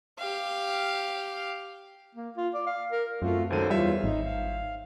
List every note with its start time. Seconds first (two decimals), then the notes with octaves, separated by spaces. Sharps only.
0.18 G4 F5
2.15 A#3
2.37 F4
2.54 D5
2.67 F5
2.92 A#4
3.22 F#2 A3 C4 F4 F#4
3.50 C#2 D#3 F#3 A4 C5 D#7
3.70 E2 E3 G3 F4 C5 C#5 E5
4.04 G#1 D#4
4.24 F5